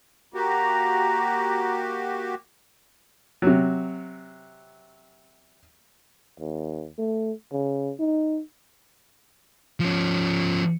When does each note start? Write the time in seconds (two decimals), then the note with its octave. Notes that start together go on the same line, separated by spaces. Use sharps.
0.34 A#3 F#4 G4 A#5
3.42 C3 F#3
6.40 D#2
6.98 A3
7.52 C#3
7.99 D#4
9.80 F3 C#4